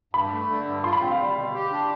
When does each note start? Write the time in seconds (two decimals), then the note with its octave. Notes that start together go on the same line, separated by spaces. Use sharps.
0.13 G2 B5
0.32 A3
0.50 D3
0.67 G2
0.84 F4 C6
0.93 B5
1.02 C4 G5
1.11 F5
1.19 G3
1.37 B2
1.54 G4
1.72 D4